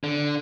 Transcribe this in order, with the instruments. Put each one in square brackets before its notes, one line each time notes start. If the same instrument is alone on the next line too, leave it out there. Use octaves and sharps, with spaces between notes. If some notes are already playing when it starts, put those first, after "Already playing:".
[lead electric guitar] D3